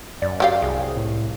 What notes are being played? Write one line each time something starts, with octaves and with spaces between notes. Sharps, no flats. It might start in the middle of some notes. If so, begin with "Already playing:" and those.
F#2 D5
F#3 G4 F5
C2 G#4
A2